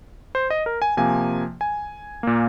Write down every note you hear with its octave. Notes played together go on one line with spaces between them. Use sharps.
C5
D#5
A#4
G#5
C3 F3 A#3 G#5
G#5
A#2 A#3